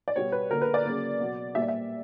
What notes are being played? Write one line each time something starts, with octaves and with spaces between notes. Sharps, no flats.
D5
B2 G3 B3 C#5
B4
D3 A#3 A#4
B4
D5
C#3 F#3 A#3
B2 F#3 B3
A#2 G3 A#3 E5
D5
E5